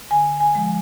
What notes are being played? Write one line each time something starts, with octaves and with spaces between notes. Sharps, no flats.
D3 G#5
G#5
F3 G#3